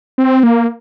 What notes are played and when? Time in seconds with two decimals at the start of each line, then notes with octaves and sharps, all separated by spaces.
0.18 C4
0.43 A#3